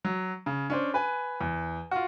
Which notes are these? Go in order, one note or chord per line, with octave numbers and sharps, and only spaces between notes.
F#3
C#3
C#4 D4 C5
B4 G#5
E2
F4 F#4